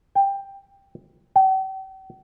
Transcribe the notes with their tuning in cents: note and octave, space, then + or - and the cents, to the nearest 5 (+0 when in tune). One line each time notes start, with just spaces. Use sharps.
G5 +10
G5 -45